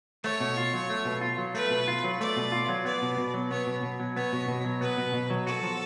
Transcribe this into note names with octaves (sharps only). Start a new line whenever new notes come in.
A3 C#5
B2
F4
F#3
A3
B2
F4
F#3
A3 B4
B2
F4
F#3
A3 D5
B2
F4
F#3
B3 D5
B2
B2
F#3
B3 C#5
B2
B2
F#3
B3 C#5
B2
B2
F#3
B3 B4
B2
B2
F#3
F#4 A4
F3